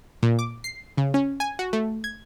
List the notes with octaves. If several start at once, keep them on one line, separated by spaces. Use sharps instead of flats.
A#2
D6
C7
C#3
C#4
G#5
F#4
A3
G#6